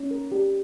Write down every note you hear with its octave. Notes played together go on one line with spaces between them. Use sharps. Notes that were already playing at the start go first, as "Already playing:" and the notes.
Already playing: C#4
A#4
G4